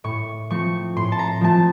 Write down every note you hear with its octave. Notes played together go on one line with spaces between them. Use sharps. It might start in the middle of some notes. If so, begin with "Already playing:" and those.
A2 C#6
F3 A3 C4 C#6
A2 C6
A5
A#5
F3 A3 C4 A5